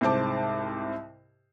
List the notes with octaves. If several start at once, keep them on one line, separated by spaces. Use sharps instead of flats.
C2 G#2 C5 A5 D6